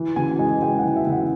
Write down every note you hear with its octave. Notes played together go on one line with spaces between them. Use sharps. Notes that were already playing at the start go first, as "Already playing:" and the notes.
Already playing: E3
C#3 G#5
G#3 G#5
G#3 G5
F#5
E3
E5
C#3
F#5